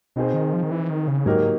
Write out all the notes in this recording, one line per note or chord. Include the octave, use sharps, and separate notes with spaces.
B2 C4 D#4 G#4 C5
D#3
F3
D#3
E3
D#3
C#3
G#2 F#3 A#3 D#4 G4 A#4